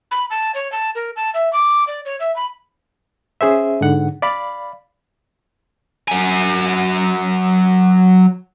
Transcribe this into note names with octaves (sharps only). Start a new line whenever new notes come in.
B5
A5
C#5
A5
A#4
A5
E5
D6
D5
C#5
E5
B5
C#4 G#4 C5 E5
G#2 D3 F#5
D5 F5 B5
F#3 G#5